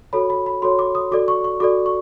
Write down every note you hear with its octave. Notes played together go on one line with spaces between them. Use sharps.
F#4 A4 C#5 B5
B5
B5
F#4 A4 C#5 C6
D6
D#6
F#4 A4 D5 D6
C#6
C#6
F#4 A4 D5 D6
C#6